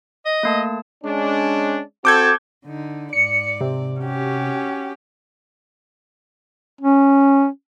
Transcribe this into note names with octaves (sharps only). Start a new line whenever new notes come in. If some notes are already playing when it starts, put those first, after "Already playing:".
D#5
A3 A#3 A5
G#3 C#4 D4
C4 F#4 A4 D6 G6 G#6
D3 D#4
G#2 D5 C#7
C3
C#4 F#4 G4
C#4